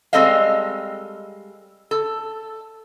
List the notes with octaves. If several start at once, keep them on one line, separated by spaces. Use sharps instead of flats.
G3 G#3 C4 A4 D#5 F5
A4